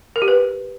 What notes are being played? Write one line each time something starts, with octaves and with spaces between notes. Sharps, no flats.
A#4
G4
B4